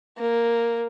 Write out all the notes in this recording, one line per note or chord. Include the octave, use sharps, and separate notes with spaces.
A#3